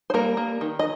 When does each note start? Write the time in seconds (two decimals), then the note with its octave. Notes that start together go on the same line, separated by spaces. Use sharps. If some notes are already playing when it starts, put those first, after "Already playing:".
0.10 C5
0.14 G3 A#3 A#4
0.37 A#3
0.61 D#3
0.79 D#5